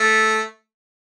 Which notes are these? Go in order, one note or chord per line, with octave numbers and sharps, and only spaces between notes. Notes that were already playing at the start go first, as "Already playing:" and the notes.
Already playing: A3